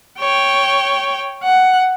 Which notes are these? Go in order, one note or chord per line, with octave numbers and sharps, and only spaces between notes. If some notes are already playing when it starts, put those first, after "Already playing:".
C#5 G5
F#5